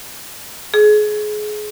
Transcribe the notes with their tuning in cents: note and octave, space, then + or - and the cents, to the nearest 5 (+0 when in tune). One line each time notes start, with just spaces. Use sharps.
G#4 +25